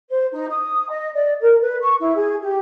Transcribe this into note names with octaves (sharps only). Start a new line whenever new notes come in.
C5
D#4
D#6
D#5
D5
A#4
B4
C#6
E4
G#4
G4